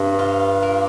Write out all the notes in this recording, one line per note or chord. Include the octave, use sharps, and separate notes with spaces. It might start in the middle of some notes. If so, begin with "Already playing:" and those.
Already playing: G2 C3
F4
A#3